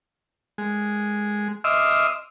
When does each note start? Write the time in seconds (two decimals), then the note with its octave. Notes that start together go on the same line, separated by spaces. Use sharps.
0.58 G#3
1.64 D#5 E5 C6 D6 E6 F6